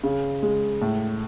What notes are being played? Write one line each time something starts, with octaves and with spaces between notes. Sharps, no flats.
C#3
G#3
A2